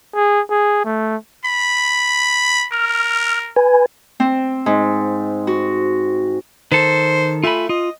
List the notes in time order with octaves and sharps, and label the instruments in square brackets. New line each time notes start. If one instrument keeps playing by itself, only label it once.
[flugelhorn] G#4
G#4
A3
[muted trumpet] B5
[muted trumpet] A#4 [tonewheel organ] F6
[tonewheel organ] B4 G#5
[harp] C4
G#2
F#4
[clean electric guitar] D#3 A4 [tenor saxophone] C5
[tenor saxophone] A3 [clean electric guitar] F4 G#5 B5
[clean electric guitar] F4 [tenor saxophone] D#5